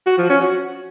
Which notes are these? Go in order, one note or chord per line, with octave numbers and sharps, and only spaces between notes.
F#4
F3
C#4
F#4